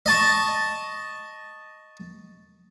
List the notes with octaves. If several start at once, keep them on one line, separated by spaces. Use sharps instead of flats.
D#5 A5 C#6